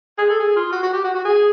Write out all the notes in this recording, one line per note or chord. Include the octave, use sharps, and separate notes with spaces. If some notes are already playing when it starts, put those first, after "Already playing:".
G#4
A4
G#4
F4
F#4
F#4
G4
F#4
F#4
G#4